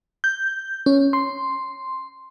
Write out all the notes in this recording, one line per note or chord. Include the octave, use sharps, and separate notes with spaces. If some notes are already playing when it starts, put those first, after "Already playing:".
G6
C#4
C6